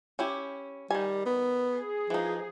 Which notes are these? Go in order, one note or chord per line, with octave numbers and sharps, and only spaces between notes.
C#4 E4 G4
D#3 G3 G#5
B3
G#4
E3 F3 D#4